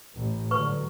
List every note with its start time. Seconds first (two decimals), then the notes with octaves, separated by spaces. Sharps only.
0.15 A1
0.51 G#2 D3 F#3 B4 C#6